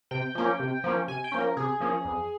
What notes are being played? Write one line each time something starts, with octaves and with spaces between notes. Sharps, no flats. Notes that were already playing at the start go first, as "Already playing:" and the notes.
C3 G5
F3 A#3 C#4
C3
F3 A#3 C#4
C3 G#5
G5
F3 A#3 C#4
A#4
C3 G#4
F3 A#3 C#4
F2